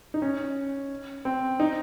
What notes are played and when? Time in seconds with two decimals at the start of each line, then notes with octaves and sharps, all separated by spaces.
0.14 D#4
0.22 C#4
1.25 C4
1.60 D#4